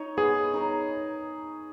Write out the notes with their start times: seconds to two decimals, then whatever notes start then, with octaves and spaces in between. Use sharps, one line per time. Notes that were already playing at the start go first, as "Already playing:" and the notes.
Already playing: D#4 C#5
0.17 B3 G#4
0.54 D#4 A#4 C#5